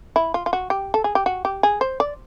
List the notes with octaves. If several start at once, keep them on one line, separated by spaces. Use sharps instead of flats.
E4
F4
F4
F#4
G4
A4
G#4
G4
F#4
G4
G#4
C5
D5